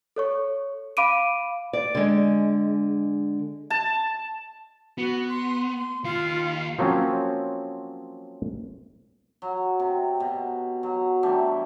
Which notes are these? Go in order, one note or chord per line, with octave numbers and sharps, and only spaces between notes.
A4 C#5 C#6
F5 B5 D6 D7 D#7
D5
D3 G#3
A5
B3 F#4
C6
C6
D#2 F4 F5
F3 F#3 A#3 C4 C#4
F#3
C3
B2
F#3
E3 G3 A3 D4